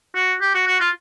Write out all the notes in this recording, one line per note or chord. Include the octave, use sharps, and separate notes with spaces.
F#4
G4
F#4
F#4
F4